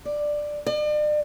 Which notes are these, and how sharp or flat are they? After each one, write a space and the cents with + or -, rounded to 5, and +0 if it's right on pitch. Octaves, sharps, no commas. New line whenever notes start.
D5 +10
D5 +40